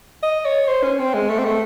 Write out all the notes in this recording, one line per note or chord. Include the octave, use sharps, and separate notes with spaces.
D#5
C#5
C5
C#4
C4
G#3
A3
C4
A3